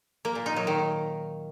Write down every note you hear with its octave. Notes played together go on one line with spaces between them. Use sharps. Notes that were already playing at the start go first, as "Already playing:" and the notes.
A#3
A#2
D#4
F#3
D#3